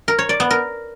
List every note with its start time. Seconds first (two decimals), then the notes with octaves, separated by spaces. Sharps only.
0.08 A#4
0.19 C#5
0.29 D5
0.40 B3
0.50 A#4